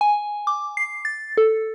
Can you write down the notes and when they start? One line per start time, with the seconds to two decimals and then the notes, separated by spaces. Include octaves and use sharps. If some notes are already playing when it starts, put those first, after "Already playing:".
0.01 G#5
0.47 D6
0.77 C7
1.05 A6
1.37 A4